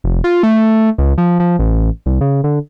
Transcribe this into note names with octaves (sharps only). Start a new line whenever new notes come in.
F1
F4
A3
C#2
F3
F3
A1
C2
C#3
D3